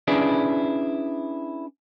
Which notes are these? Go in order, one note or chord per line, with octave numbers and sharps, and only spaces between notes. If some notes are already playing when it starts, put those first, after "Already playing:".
C#4 D4 E4 G#4 B4 D5